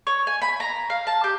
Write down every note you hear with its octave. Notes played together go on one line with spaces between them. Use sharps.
C#5
G#5
B5
A#5
F5
A5
G4